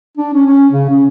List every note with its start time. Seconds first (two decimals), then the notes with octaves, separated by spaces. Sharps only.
0.18 D4
0.34 C#4
0.47 C#4
0.72 C#3
0.89 C#4